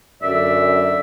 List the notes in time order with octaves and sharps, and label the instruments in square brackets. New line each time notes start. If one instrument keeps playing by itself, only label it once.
[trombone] F#2 [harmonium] D3 D5 [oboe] E5